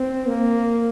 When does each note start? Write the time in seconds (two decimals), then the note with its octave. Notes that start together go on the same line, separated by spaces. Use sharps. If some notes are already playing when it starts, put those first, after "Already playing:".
Already playing: C4
0.27 A#3